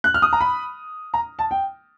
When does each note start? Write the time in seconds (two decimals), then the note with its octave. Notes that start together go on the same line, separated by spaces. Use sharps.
0.04 F#6
0.14 F6
0.22 D#6
0.33 A#5
0.41 B5
1.14 A#5
1.39 A5
1.51 G5